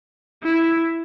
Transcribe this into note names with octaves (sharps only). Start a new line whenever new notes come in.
E4